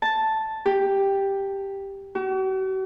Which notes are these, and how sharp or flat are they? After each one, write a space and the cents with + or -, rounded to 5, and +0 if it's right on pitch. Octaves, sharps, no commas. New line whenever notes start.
A5 +0
G4 +5
F#4 +45